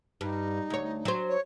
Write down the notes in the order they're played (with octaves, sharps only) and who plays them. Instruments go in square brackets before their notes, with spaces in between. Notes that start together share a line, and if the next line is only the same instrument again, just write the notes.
[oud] G2 [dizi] D#4
[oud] D2 C#5
F#3 C5
[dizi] C#5